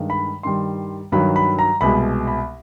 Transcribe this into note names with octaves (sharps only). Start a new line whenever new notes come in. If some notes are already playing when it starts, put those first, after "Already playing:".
Already playing: G2 D#3 G#3
B5
G2 D#3 G3 C6
G2 D#3 F#3 B5
B5
A#5
C2 B2 G#3 B5
B5